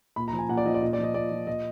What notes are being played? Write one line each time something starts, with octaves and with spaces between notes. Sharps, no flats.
A#2 B5
A#5
F3
G#5
A#2 F#5
D5
F3 D#5
D5
A#2 D#5
D5
F3 D#5
A#2 D5
F3
A#2 D#5